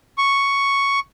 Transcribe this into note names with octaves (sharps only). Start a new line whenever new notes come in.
C#6